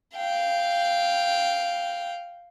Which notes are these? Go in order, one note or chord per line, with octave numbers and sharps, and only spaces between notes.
F5 G5